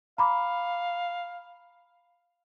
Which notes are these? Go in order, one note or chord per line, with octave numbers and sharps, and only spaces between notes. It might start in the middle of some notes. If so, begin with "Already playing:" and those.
F5 A#5 B5 D6